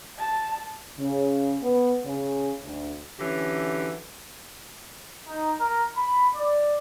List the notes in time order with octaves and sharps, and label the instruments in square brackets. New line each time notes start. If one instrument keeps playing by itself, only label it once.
[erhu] A5
[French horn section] C#3
B3
C#3
D2
[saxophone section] D3 E3 F#3 C#4 G4
[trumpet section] D#4
A#4
B5
D5